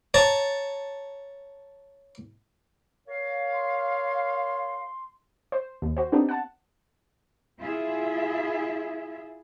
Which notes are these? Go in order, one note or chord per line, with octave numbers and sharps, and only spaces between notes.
C#5 A5 A#5 C#6
A#4 C#5 F5
C6
C5
D#2
F#4 C5
B3 C4 D4 D#4 G4
F#5 A5
E4 F4 G#4 E5